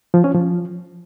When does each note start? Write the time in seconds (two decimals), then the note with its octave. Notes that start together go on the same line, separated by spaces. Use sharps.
0.14 F3
0.24 C#4
0.34 F3